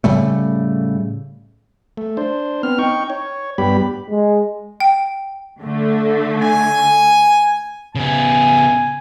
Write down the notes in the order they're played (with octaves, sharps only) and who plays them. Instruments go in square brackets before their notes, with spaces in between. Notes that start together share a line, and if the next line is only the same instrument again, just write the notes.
[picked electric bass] A2 C#3 G3 A3
[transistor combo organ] A3
D4 C5
B3 C4 F6
D#4 G5 C#6
C#5
G2 G3 B3 G4 B5
[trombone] G#3
[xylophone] G5
[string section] D3 A3
[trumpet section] G#5
[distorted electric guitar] C#3 B3 [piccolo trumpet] G#5